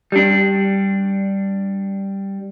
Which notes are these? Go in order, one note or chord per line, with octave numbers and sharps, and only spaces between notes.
G3 D4